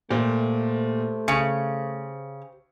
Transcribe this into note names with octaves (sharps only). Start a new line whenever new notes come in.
A#2 A3 G4 C5
C#3 C#7